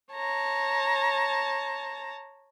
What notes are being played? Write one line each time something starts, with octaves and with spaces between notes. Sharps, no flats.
C#5 A5 A#5